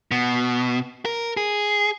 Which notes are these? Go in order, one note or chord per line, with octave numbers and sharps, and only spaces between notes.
B2
A#4
G#4